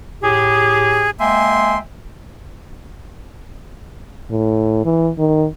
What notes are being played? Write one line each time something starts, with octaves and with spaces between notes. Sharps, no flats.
A2 G4 G#4
G#3 A#3 E5 G5 G#5 C6
A2
E3
D#3